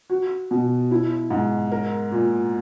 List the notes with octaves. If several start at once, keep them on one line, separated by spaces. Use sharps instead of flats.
F#4
B2
E4
G#2
A#4
A#2